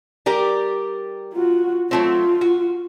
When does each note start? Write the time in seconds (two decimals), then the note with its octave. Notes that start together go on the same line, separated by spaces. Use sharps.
0.26 G3 G4 A#4
1.33 F4 F#4
1.91 F#3 A3 C4 F4
2.41 F#4